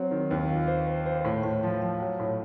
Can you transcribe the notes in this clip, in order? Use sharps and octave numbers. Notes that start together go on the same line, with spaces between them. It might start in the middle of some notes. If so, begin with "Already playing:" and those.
Already playing: F#3 C4
D#3
D#2
F4
C5
C5
C5
A2
A2
F3
F3
F#3
A2